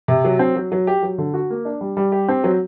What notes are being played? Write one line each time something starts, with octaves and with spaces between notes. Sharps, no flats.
C3
F#3
C4
F#3
F#3
G4
F#3
D3
F#4
A#3
D4
G3
G3
G4
C4
F#3